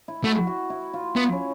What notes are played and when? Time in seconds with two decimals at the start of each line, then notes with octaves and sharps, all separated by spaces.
0.08 E4
0.24 A3 F#4
0.47 F#4
0.70 E4
0.93 F4
1.16 B3 E4
1.32 C#4